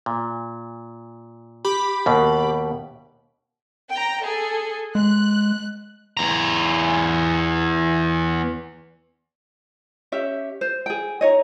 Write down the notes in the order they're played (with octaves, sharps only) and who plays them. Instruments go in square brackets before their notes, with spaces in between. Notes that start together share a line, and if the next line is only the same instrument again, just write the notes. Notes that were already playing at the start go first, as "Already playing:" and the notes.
[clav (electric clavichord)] A#2
[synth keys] G4 B5 D6
[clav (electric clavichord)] D#2 B2
[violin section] G5 A#5
G#4 A4
[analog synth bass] G#3 [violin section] F#6
[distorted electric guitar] E2 A#5
[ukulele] C#4 G4 E5
C5
G#4 G5
D#4 C#5 D#5